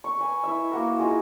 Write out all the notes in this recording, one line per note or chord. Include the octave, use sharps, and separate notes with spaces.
C#6
B4 G#5
E4 B4 E5
A#3 F#4 A#4
D#4 F4 F#4 G#4